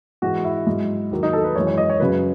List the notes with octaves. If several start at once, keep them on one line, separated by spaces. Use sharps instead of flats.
G#2 E3 G#3 F#4
E4
G#2 F#3
D#2 D#3 F#3
D#4
A4
B4
F#2 E3 G#3 C#5
C#5
D#5
C#5
F#2 C#3 F#3 B4